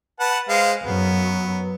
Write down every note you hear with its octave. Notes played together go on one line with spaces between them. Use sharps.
B4 F#5 A5
G#3 C5 F5
F#2 F#3 B3